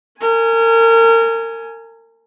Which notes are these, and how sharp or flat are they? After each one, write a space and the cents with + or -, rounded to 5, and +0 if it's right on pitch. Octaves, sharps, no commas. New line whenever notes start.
A#4 -35 G#5 +5